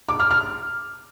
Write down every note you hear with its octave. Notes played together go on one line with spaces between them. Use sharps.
D6
F6
F6